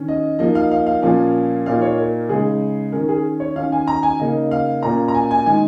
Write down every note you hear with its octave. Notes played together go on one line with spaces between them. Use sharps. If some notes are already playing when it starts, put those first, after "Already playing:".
Already playing: D#3 C#4
D#5
F3 A#3 D#4 D#5
F5
F5
F5
A#2 F3 A#3 C#4
A#2 A#3 D#4 F5
C#5
A#4
C#3 G#3 D#4 G#4
D#3 C#4 A#4
G#4
C#5
D#3 C#4 F5
G#5
A#5
G#5
C#3 A#3 D#4 D#5
F5
A#2 A#3 C#4 A#5
A#5
G#5
G#5
D#3 G#3 D#4 G#5